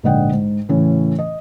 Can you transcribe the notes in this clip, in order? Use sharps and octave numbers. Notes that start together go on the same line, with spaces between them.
A#1 G#2 D3 D#5 F#5 G5
G#2
A2 C#3 E3 C#4
D#5